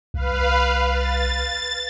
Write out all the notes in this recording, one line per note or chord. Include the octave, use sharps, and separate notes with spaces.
C2 B4 F5
A6